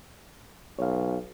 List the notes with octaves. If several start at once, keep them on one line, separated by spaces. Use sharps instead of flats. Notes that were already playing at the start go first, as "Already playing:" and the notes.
B1 C#5 F5